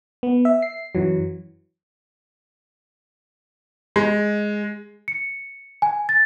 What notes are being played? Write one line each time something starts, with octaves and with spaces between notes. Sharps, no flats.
B3
E5
C7
F#2 E3 F#3
G#3
C#7
G#5
A6